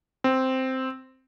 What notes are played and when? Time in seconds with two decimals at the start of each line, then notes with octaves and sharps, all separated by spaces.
0.24 C4